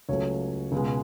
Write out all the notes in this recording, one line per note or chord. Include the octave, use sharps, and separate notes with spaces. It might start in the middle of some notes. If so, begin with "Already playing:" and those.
C#2 C#3 F#3 A3 C#5
C#2 B2 G#3